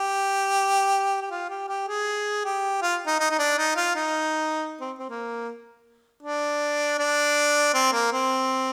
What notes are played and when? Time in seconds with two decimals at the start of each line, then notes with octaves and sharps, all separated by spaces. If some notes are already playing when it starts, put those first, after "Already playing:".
Already playing: G4
1.22 G4
1.31 F4
1.49 G4
1.69 G4
1.88 G#4
2.45 G4
2.82 F4
3.07 D#4
3.20 D#4
3.30 D#4
3.39 D4
3.58 D#4
3.76 F4
3.96 D#4
4.81 C4
4.99 C4
5.10 A#3
6.23 D4
6.99 D4
7.74 C4
7.92 A#3
8.13 C4